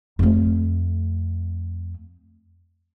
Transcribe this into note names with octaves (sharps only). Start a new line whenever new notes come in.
F2 A3